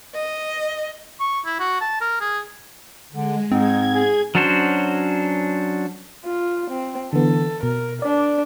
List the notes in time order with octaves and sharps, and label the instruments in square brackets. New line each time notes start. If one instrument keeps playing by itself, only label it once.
[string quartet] D#5
[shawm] C#6
E4
F#4
A5
A#4
G#4
[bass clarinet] D3 [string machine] G#3
[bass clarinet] G#2 [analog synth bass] C4 [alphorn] D#4 [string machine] G#6
[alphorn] G#4
[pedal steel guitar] F#3 C#4 D4 F#4 C5
[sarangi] F4
C4
[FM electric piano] D3 E3 B3 [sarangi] A4
[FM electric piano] B2 [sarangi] A#4
[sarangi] D4 [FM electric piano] D5